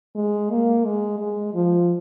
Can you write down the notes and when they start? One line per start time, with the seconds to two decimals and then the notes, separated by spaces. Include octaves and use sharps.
0.15 G#3
0.50 A#3
0.85 G#3
1.19 G#3
1.54 F3